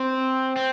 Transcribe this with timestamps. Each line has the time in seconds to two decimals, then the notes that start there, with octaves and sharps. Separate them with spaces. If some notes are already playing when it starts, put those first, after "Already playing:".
Already playing: C4
0.56 C4